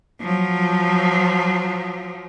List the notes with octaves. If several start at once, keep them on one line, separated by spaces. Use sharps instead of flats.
F3 F#3